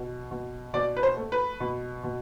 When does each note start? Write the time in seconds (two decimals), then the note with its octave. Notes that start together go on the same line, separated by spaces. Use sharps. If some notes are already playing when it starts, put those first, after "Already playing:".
Already playing: B2
0.31 B2
0.73 B2 D5
0.97 B4
1.03 C5
1.17 A3
1.32 B4
1.60 B2
2.03 B2